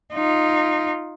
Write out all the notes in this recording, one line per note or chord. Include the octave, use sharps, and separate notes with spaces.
D#4 F4